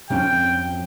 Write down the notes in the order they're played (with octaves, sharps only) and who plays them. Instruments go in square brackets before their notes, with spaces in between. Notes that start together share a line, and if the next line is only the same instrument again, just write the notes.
[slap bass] F2 C4 C#4 [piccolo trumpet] G5